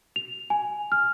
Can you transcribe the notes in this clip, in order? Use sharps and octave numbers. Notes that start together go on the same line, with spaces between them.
F7
G#5
F6